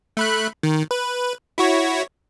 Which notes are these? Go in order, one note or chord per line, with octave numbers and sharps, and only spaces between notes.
A3 B5 F#6
D#3
B4
E4 F#4 C#5